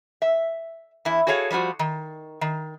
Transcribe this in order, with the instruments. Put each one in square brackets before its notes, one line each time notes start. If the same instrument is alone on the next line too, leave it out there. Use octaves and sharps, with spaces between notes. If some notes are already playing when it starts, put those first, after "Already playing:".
[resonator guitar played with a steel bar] E5
E2 E4
F#4 G#4 A4 C#5 E5 F5
F3 G3 F4 F#4 C5
D#3
D#3